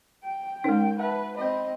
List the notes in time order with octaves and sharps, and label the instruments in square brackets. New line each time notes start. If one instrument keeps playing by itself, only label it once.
[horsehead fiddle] G5
[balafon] G#3 D#4 [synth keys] C#4 A#4 D7
[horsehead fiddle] B4 [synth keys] E5 F#5 A5
[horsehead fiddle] C4 D#5 [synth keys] B5 G6